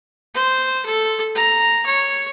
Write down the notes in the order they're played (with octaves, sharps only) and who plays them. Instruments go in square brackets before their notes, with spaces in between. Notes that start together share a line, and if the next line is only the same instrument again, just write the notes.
[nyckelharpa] C5
A4
A#5
C#5